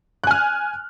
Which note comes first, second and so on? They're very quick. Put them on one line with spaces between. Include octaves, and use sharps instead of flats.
F#6 G#5 F6